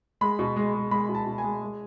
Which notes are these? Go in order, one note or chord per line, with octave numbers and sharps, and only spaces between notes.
G#3 B5
B2
G#3
G#3
G#3 B5
B2
A5
B2
G#5
G#3
G#3